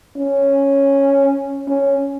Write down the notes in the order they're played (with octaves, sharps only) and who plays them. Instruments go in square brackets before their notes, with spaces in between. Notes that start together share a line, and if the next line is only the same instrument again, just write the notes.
[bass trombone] C#4
C#4